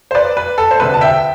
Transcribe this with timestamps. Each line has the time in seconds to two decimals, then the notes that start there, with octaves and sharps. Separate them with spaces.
0.11 C5
0.15 B4 D5
0.37 B4
0.58 A4
0.71 C5
0.80 E1 D2 C3 B4
0.94 A5
1.01 E5 G5